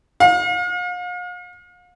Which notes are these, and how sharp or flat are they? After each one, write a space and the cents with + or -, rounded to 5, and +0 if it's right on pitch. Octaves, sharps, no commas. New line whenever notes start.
F5 +40